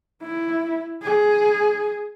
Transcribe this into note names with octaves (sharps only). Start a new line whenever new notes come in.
E4
G#4